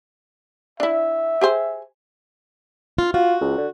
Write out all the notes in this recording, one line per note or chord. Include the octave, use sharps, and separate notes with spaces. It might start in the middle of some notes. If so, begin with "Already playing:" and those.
D4 E4 E5
G4 G#4 C5
F4
F4 F#4
C#2
D3